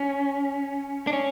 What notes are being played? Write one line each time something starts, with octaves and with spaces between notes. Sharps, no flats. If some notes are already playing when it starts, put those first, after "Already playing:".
Already playing: C#4
D4
C#4